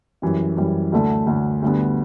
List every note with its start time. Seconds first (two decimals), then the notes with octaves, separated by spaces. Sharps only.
0.22 F#2 E3 G3
0.57 F#2 E3 G3
0.92 D2 D3 A3
1.27 D2 D3 A3
1.62 D2 D3 G3 B3